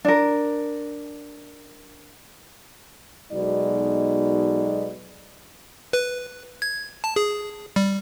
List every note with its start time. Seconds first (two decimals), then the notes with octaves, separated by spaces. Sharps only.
0.05 D4 A#4
3.32 B1 B2 G#3 D#4 D5
5.93 B4
6.62 G#6
7.04 A5
7.16 G#4
7.76 G3